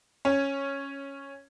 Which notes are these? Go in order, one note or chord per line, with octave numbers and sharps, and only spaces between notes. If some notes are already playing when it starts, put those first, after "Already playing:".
C#4